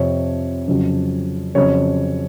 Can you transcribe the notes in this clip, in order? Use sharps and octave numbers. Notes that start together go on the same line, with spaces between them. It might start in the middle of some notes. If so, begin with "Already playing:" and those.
Already playing: F2 C3 F3 C#5
F2 C#3 F#3
F2 C#3 F#3 C#5